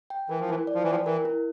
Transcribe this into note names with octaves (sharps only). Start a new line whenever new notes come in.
G5
E3 A#4
F3
E3 E4
D5
F3
E3
F3 G5
E3 A#4
E4